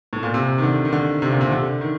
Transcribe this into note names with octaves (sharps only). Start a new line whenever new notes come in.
A2
A#2
C3
D#3
D3
D#3
D3
C3
A#2
C3
D3
D#3